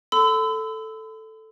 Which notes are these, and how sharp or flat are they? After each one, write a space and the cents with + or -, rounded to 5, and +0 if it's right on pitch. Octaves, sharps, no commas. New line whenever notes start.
A4 +0 B5 +45 E6 -10